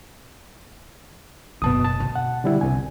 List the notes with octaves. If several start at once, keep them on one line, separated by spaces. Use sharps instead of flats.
F#1 B2 B3 A5 D#6
A5
B2
F#5
D3 G3 E4
C2 G#5